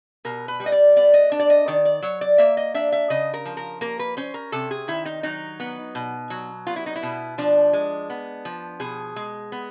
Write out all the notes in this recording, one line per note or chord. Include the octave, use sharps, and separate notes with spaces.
B2 A#4
B4
G3
D#5
D5
B3 D5
D#5
D4
D5
D#5
D#3 D5
D5
F#3 C#5
D5
A#3 E5
D#5
D4 E5
E5
C#3 D#5
A#4
F3
A#4
A#3 A#4
B4
C#4 C5
A#4
C3 A4
G#4
D#3 E4
D#4
F#3 D#4
B3
B2
F#3
B3 F4
E4
D#4
E4
B2
F3 D4
G#3
B3
F3
B2 G#4
G#3
B3